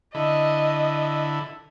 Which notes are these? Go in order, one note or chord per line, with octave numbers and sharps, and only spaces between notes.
D3 E4 D#5